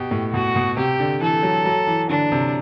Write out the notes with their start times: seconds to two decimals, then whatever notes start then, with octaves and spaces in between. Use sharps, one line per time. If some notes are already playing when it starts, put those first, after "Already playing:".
Already playing: B2 G4
0.11 A2
0.33 B2 F#4
0.56 B2
0.77 C3 G4
1.00 D3
1.21 E3 A4
1.43 F#3
1.65 F#3
1.87 E3
2.09 D3 D4
2.32 C3